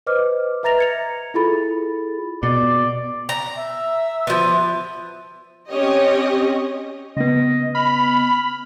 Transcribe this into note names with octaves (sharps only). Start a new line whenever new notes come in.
B4 C5 D#5 D6 F6
B4 E5 A#5 A6 A#6 F7
G#6 C#7 F7
E4 F4 G#4 A4 B5 A6
B2 D5
A#5
E5
F3 B3
C4 C#4 G4 C#5 D#5
C#3 B3 D#5
B5 F6